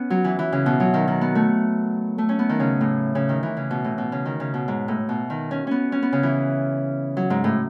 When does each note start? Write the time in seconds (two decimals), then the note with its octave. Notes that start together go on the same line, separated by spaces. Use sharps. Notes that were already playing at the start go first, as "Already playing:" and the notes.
Already playing: B3 C#4
0.10 F#3
0.24 E3
0.39 E3
0.52 C#3
0.66 B2
0.80 F#3
0.94 D#3
1.08 D#3
1.21 B3
1.35 A3
2.18 A3
2.29 C#4
2.39 B3
2.49 D#3
2.60 C#3
2.81 A2
3.15 C#3
3.29 D#3
3.43 E3
3.57 C#3
3.71 B2
3.84 A2
3.98 B2
4.12 C#3
4.25 D#3
4.40 C#3
4.54 B2
4.68 G#2
4.88 A2
5.09 B2
5.30 D#3
5.51 C#4
5.67 B3 C#4
5.92 C#4
6.02 B3
6.12 C#3
6.23 E3
7.17 F#3
7.30 G#2
7.44 A2